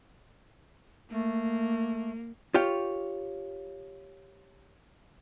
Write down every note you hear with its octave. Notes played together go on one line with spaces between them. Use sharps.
A3 A#3
F4 G4 C#5 G5